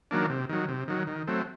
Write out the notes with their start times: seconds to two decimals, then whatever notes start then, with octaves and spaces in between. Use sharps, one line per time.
0.11 D#3 F#3 A#3 D4
0.30 C3
0.49 D#3 F#3
0.68 C3
0.88 D#3 F#3
1.07 D#3
1.27 F#3 A3 C4